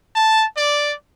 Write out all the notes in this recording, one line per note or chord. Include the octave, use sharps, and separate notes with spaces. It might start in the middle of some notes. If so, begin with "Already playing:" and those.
A5
D5